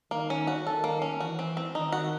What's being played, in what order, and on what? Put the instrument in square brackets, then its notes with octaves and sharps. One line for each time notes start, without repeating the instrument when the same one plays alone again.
[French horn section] D#3 [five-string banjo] A#3
[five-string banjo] C#4
F#4
[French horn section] D#3 [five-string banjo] A4
[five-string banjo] A#3
C#4
[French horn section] E3 [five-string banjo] F#4
[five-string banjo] C4
C4
[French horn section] D#3 [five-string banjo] D#4
[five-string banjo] F#4